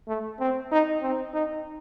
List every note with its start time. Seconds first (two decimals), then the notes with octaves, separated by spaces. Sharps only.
0.08 A3
0.40 C4
0.72 D#4
1.03 C4
1.34 D#4